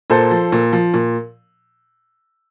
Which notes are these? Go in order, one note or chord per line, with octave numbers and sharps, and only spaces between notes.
A#2 A4 C5
F3
A#2
F3
A#2